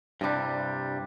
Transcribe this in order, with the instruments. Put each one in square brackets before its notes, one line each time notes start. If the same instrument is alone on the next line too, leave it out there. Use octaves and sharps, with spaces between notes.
[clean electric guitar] G2 C3 G3 [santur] D4 E4